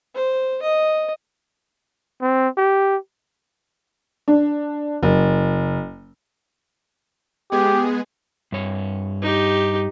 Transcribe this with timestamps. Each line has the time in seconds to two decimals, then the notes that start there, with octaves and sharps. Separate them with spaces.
0.15 C5
0.62 D#5
2.22 C4
2.57 G4
4.28 D4
5.03 F#1
7.52 G#3 B3 G4 G#4
8.52 G2 C#5
9.22 D#4 G4